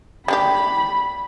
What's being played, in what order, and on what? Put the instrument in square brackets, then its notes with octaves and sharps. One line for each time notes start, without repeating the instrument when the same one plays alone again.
[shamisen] G3 D4 G4 [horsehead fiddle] B5